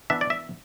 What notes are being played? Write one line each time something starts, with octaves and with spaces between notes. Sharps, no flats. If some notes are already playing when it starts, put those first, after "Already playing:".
E3 B3 D4 E5
D5
E5